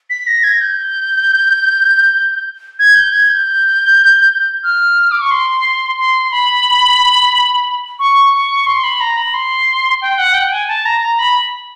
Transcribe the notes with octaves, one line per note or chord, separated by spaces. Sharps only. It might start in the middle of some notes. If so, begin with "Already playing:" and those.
B6
A#6
G#6
G6
G#6
G6
G#6
G6
F6
D6
C#6
C6
C6
B5
C#6
C#6
C6
B5
A#5
B5
C6
G5
F#5
G5
G#5
A5
A#5
A#5
B5